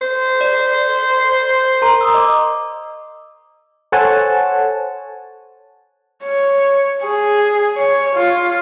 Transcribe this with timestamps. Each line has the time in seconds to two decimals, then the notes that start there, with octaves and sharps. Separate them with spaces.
0.01 C5
0.41 D5
1.82 A#4 A#5 C6
2.01 A#5 D#6 E6
2.14 D#5 D6
3.92 A4 C5 C#5 F#5 G#5 A5
6.23 C#5
7.05 G#4
7.77 C#5
8.16 F4